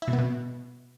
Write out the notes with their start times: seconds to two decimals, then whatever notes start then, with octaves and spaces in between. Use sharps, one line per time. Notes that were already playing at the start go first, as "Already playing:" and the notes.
0.02 E4
0.08 B2
0.13 B3
0.18 B2